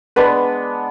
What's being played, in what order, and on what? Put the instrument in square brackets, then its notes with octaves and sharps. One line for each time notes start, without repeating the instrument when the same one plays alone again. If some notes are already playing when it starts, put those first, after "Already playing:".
[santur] G#3 B3 D4 [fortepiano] B4